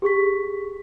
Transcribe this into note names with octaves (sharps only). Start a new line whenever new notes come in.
G4 G#4 C#6 B6